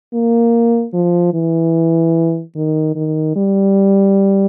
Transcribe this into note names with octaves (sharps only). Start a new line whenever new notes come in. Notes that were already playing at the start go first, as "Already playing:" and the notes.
A#3
F3
E3
D#3
D#3
G3